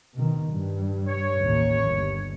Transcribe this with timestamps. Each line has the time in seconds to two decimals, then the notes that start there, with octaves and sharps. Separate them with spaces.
0.14 B2 D#3
0.51 G2
1.07 C#5
1.39 A1 D#2
1.89 G1